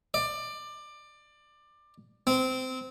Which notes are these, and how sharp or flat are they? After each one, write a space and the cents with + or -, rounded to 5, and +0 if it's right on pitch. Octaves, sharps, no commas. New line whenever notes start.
D5 +20
C4 -20